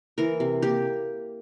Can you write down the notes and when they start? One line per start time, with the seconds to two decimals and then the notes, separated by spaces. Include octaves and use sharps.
0.18 E3 A#4
0.40 C3
0.62 A#3 G4